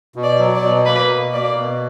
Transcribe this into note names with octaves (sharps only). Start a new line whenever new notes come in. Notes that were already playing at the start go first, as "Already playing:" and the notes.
B2
D5
F#3
D5
B2
A#3 B4
B2
A#3 D5
B2